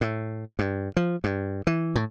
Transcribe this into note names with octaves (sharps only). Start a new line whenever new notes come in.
A2
G2
F3
G2
E3
A2